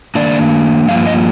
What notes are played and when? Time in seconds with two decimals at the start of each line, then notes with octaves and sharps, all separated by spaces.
0.15 D#3 A#3 D4 D5
0.88 G2 F3 A#3 F4 F5
1.07 D#5